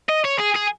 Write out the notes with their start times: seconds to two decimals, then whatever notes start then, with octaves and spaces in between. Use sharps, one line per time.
0.09 D#5
0.25 C#5
0.40 G#4
0.56 G#4